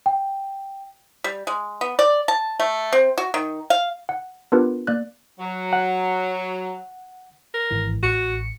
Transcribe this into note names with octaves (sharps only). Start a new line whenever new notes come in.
G5
G3
G#3
B3
D5
A5
A3
C4
F#4
D#3
F5
F#5
B3 D4 F4 G4 A#4 B4
A#3 D5 F#6
F#3
F#5
A#4
G#1 E3
A1 F#4 C#7